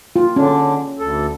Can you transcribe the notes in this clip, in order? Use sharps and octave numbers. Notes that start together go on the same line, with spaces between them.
F4
D3 C#4 D4
D2 A4